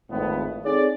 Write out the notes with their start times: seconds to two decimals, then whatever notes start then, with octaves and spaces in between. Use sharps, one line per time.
0.11 G#1 F2 A2 B3
0.65 C4 D#4 G#4 A4 C#5 D5